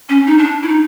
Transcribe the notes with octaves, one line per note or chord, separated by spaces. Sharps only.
C#4
D#4
D4
E4
D#4